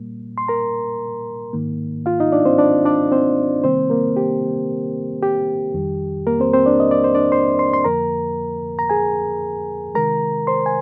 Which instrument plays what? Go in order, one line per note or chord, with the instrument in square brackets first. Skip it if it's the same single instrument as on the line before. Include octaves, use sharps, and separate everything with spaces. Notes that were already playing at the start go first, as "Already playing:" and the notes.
Already playing: [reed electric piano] A#2 G3 A#3
C6
A#4 A#5
G#2 D#3 A#3
F4 F5
D#4 D#5
D4 D5
C4 C5
D4 D5
D4 D5
C4 C5
C3 D#3 G3 A#3 C4 C5
A#3 A#4
G4
G4
F2 D#3 G3
A#3 A#4
C4 C5
C4 C5
D4 D5
D#5
D5
C5
D4 D5
C5 C6
C5 C6
C6
F2 D3 F3 A#3 A#4 A#5
A#5
G#4 G#5
C3 D#3 G#3 A#4 A#5
C5 C6
G#5